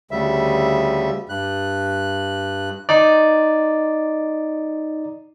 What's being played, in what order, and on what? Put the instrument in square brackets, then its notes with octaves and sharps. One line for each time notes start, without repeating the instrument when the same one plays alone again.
[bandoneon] D2 C#3 G3 E5
G2 F#6
[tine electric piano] D#4 D5